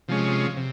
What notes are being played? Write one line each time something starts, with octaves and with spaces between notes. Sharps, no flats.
C3 F3 G#3 C#4
C3